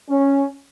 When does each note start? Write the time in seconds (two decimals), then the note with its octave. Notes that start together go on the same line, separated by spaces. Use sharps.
0.09 C#4